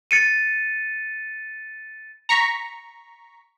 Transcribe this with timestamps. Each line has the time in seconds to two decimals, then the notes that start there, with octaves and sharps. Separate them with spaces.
0.11 A6 C#7 D#7
2.29 A#5 C#6 B6